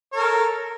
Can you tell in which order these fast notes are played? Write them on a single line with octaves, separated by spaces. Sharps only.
C#5 A#4 A4